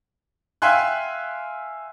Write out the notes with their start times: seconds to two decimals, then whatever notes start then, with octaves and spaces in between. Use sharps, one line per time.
0.62 E5 F5 G5 G#5 C6 F#6